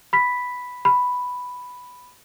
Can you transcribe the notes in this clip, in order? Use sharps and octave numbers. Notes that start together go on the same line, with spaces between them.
B5 B6
B5